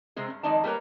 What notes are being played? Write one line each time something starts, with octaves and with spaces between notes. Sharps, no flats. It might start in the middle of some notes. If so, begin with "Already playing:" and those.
C3 G#3 C4 G#4
G2
F2 D#3 G#3 D#4 D5 A5
G3 A3 A#3 A#4 B4 C#5